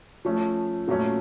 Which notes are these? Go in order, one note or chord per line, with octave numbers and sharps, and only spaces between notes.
F3 A3 C#4
A#2 F#3 A3 C#4